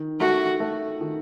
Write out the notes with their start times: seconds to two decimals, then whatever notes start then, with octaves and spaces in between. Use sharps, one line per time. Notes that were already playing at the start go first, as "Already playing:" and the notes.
Already playing: D#3
0.20 A3 F#4
0.60 A3
1.01 D#3